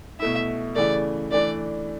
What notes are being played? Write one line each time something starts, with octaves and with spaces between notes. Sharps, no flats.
B2 A3 E4 E5
C#3 E3 A3 D5
E3 A3 D4 D5